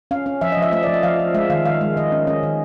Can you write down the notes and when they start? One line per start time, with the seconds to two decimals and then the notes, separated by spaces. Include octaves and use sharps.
0.11 C#4 F5
0.26 C#4
0.41 F3 E5
0.52 D#5
0.57 F3
0.62 E5
0.72 A3 E5
0.83 F3 D5
0.94 D#5
1.03 F3 F5
1.19 F3
1.34 G#3 E5
1.50 D#3 F5
1.65 D#3 F5
1.81 G#3
1.97 D#3 D#5
2.12 C#4
2.27 C#4 D#5
2.43 D#3